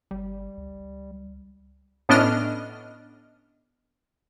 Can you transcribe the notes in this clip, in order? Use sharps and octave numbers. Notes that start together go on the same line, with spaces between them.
G1 G3
C#2
A2 B3 C#4 D4 D#5 F6